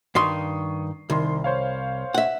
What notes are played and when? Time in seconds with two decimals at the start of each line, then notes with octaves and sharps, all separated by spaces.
0.15 G2 D#3 C6 C#6 D#6 C7
1.10 C2 D#3 C6
1.44 C5 C#5 F5
2.14 E5 F#5